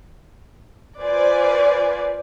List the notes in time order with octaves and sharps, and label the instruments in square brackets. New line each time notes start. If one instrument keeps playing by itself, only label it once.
[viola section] F4 B4 C5 D5 G#5